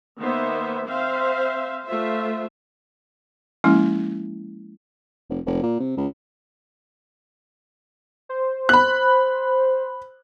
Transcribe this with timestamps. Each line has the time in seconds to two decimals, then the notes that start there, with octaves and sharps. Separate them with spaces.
0.19 D#3 A#3 B3 C5 E5
0.87 C4 C5 E5 F5
1.85 A3 F4 C5 E5
3.64 F3 G#3 A#3 C#4 E4
5.30 F1
5.46 F1
5.63 A#2
5.80 C3
5.97 C#2
8.29 C5
8.69 B5 F#6